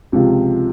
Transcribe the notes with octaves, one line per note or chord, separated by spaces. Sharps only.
C#2 C3 F3 C4 F4